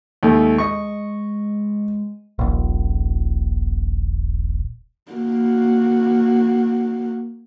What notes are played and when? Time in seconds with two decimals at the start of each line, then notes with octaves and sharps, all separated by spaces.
0.23 D#2 G#3 A3
0.58 D#5 C#6
2.39 D#1 A#1
5.12 A#3 F#4